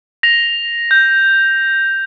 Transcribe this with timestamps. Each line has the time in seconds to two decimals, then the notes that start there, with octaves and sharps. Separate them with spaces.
0.23 A#6 F7
0.91 G6